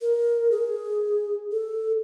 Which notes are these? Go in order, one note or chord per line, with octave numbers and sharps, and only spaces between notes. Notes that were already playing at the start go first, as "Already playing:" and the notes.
A#4
G#4
A4